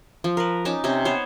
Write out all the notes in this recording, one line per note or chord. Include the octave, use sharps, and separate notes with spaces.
F3
A#4 B4
C#4 D#4 A5 D6
C3 C4 C#4
B3 C5 C#5